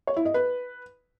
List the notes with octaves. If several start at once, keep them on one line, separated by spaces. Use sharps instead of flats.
C#5
E4
D#5
B4